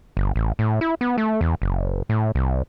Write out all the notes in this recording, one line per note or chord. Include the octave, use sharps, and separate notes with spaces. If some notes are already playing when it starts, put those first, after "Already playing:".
G1
A1
A2
E4
B3
A3
E2
F#1
A2
C2